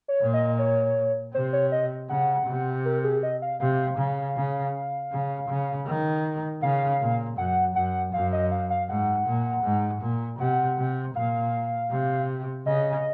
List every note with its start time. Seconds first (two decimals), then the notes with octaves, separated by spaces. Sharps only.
0.08 C#5
0.21 A#2
0.34 D#5
0.59 C#5
1.34 C3 C5
1.53 C#5
1.72 D#5
2.09 C#3 F#5
2.47 C3
2.85 A#4
3.04 G#4
3.23 D#5
3.42 F5
3.60 C3 F5
3.98 C#3
4.36 C#3
5.12 C#3
5.49 C#3
5.87 D#3
6.62 C#3 F5
7.00 A#2
7.38 F#2 F#5
7.75 F#2 F#5
8.13 F#2 F5
8.33 D#5
8.52 F5
8.70 F5
8.89 G#2 F#5
9.27 A#2
9.64 G#2
10.02 A#2
10.39 C3 F#5
10.78 C3
11.15 A#2 F5
11.91 C3
12.66 C#3 D#5